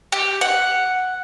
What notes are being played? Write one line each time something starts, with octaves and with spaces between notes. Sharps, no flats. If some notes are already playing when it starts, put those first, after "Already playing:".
G4
F#5